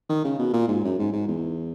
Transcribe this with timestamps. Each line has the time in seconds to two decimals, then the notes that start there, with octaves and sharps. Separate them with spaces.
0.09 D#3
0.24 C#3
0.39 B2
0.53 A#2
0.68 G#2
0.84 F#2
0.98 G#2
1.13 G#2
1.28 E2